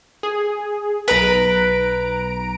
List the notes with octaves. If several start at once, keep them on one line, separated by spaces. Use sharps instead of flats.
G#4
B1 B4 A#5 D7